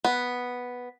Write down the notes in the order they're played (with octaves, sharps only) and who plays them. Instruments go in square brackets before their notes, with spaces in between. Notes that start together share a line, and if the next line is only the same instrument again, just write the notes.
[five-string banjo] B3